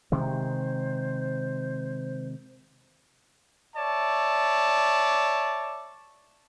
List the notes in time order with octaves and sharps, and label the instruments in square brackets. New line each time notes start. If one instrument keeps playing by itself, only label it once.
[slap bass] C3 D#3 G#3 [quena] C5
[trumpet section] C#5 D5 E5 A5